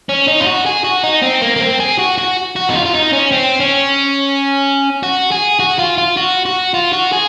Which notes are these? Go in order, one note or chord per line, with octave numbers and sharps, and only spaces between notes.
C#4
D#4
F4
F#4
G#4
F#4
D#4
C4
A#3
A#3
C4
G#4
F#4
F#4
F#4
D#4
F4
F4
D#4
C#4
C4
C#4
F#4
G#4
F#4
F4
F4
F#4
F#4
F4
F#4
G#4